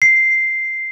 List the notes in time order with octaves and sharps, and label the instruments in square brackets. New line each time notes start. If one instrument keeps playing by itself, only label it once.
[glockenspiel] C7